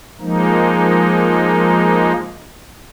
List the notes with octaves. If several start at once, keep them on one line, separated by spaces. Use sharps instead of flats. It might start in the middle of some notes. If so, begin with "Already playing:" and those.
F3 G#3 A#3 D#4